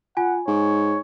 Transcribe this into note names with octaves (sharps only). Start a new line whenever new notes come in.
F4 F#5 G#5
G#2 C#5 G#5